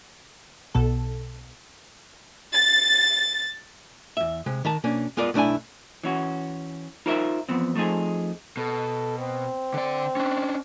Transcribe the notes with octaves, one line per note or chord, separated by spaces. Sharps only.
B1 B2 A4
A6
E2 E5
C3 G#3
D#3 A#4 A5
B2 A#3 C#4 D4
G#3 B3 F4 A#4 D5
B1 A3 D4 E4 G#5
E3 C#4 F#4
D#4 F4 A#4 C5 D#5 E5
E2 F3 B3 C4
F3 A3 C4 D#4 G#4
B2 A4
C4
D3 D5
C#4 D4